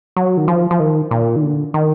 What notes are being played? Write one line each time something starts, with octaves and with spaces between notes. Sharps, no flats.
F#3
D#3
F3
F3
D#3
A#2
D#3
D3
D#3